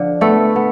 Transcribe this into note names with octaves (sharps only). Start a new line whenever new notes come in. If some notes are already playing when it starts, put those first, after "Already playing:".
Already playing: D3 F3
A3 B3 A4
B3